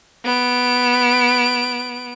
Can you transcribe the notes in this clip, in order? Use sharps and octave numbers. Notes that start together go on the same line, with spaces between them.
B3 D7